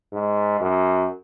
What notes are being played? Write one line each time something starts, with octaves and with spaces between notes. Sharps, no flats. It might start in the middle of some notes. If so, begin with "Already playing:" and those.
G#2
F#2